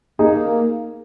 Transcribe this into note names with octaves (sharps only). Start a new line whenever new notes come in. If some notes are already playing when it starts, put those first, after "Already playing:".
A#3 D#4 G#4